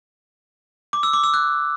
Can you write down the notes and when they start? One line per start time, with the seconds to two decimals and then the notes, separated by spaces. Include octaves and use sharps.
0.93 D6
1.03 E6
1.13 D6
1.24 E6
1.34 F#6